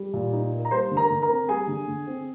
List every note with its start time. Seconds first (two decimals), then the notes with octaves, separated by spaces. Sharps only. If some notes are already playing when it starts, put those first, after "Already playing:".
Already playing: G3
0.14 A#2
0.33 D#4
0.53 A#3
0.65 A#5
0.71 G3 C5 C6
0.91 D3
0.97 A#4 A#5
1.10 D3
1.22 A#4 A#5
1.29 C4
1.48 G3 G#4 G#5
1.67 D3
1.88 D3
2.07 C4